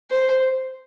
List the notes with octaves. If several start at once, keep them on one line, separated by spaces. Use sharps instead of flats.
C5